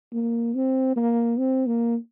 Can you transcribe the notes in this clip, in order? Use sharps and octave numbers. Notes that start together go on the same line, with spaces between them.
A#3
C4
A#3
C4
A#3